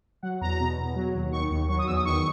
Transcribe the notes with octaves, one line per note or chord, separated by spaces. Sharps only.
F#3 F#5
E2 A#5
B2
E2
F#3
D#2
D#3 C#6
D#2
F#3 C#6
D#6
E2 E6
D#6
D#3 C#6